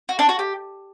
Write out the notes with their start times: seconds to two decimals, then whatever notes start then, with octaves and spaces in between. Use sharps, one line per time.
0.09 F#4
0.19 D4
0.29 F#4
0.39 G4